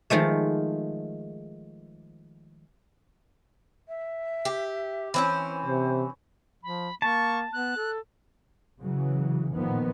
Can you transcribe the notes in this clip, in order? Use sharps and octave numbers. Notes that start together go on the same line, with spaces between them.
D#3 F3 G#3 A3
E5
G4
E3 C4 C#4 C5
C3
F3 B5
A#3 A5 C#6
B3 F#6
A4
C#3 E3 F#3
A#2 D#3 F3 B3